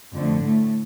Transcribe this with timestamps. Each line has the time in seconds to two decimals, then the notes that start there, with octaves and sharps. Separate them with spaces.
0.14 F2 D3 A3
0.43 A2 A3